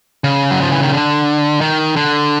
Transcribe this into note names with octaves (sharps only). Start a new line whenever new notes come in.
C#3
F#3
F3
E3
D#3
D3
D#3
D3